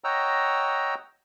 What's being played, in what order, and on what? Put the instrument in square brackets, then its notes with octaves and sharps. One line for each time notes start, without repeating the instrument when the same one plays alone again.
[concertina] C#5 D#5 F#5 G5 A#5 E6